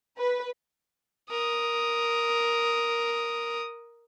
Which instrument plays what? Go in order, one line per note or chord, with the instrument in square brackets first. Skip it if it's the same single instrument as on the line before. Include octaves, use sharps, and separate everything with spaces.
[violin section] B4
[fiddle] A#4 D#6